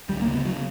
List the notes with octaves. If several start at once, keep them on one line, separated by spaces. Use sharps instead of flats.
D2 G3
A#3
C#3
B3
C#3 F#3